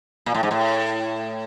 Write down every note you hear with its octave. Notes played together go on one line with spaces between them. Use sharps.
A#2
A2
G#2
A2